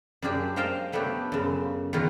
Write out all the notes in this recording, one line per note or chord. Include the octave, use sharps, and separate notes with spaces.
F#2 A#3 D4 G4 G#4
C5 D#5 F5 G5 A5 A#5
F#3 A3 B3 D4 G4
F#2 C#3
E2 B2 D#3 F4 B4 A#5